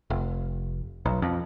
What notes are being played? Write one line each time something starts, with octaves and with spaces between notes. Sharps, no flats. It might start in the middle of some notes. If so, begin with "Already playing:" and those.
F1
B1
F2